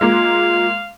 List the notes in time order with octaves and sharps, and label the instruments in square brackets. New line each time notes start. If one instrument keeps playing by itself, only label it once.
[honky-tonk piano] G#3 A#3 [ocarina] F4 [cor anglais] F5